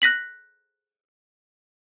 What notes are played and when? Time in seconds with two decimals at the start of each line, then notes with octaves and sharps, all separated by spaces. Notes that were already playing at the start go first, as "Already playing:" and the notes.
0.02 F#6 A#6 B6 F#7